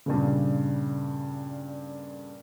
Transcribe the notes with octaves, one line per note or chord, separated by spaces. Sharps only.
G2 A#2 C#3